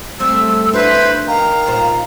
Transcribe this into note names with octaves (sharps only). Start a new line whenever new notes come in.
G3 A3 C4 C5 E6
D4 E4 F#4 B4 C5
D#3 F5 A#5
A#2 F4 C5